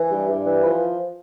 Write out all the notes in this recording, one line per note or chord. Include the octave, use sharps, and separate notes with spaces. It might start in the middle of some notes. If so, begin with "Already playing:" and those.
Already playing: E3
G2
G2
E3
F3 B4